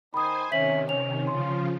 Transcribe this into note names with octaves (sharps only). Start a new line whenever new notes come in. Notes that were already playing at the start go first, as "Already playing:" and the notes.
D#3 C5 G#5 B5 D#6
C3 D#3 C#4 E5 B6 F#7
C#4 F7
C#3 F3 F4 C6